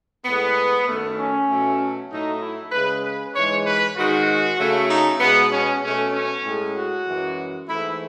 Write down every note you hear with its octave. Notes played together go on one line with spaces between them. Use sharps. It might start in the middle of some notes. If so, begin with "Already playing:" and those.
A2 G#3 B3
F#2 D#3 A3
C#4
B2 F#3 A3
A2 F#3 A3 D#4
E4
C#3 G#3 B4
B4
G#2 E3 G#3 C#5
B4
G#2 D#3 G#3 F#4
C#3 F#3 A3
D#4
B2 G#3 B3
C#4
B2 A3 C#4
C#4
A2 G#3
F#4
F#2 E3 G#3
G#2 E3 A3 E4